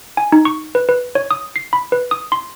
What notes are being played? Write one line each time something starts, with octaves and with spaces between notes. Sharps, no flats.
G#5
D#4
C#6
B4
B4
C#5
D#6
C7
B5
B4
D#6
C6